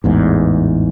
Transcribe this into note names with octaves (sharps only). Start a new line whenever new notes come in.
A1 E2 G#2